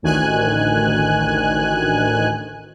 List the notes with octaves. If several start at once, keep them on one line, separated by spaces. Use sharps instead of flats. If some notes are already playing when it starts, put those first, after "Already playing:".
A1 D2 D#3 G#5 F#6